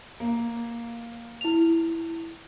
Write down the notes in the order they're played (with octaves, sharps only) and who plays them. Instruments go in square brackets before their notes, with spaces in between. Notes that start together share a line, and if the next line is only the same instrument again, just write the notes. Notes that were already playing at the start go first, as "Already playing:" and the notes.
[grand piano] A#3
[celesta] E4 F7